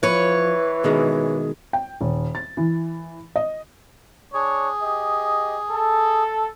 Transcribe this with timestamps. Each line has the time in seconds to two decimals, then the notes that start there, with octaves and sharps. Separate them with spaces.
0.03 E3 F3 B4 C#5
0.84 B2 D#3 G#3 G#4
1.73 G5
2.01 D#1
2.35 A6
2.57 E3
3.36 D#5
4.34 D4 G#4 C#5
4.83 G4 D#5
5.71 A4